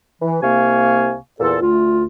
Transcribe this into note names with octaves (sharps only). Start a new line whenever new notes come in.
E3
C2 C3 A#3 F5 G#5 C#6
E2 A#2 F4 A4
D2 A3 F4